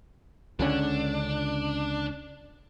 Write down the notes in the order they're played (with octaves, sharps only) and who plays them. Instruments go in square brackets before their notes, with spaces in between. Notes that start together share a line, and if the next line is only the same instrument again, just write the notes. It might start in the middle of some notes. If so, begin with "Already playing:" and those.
[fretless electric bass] C#2 D3 C#4 [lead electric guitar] D4